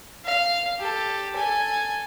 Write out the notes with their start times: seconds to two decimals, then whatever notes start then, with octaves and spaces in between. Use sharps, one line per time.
0.25 F5
0.79 G4 A4
1.36 A4 G#5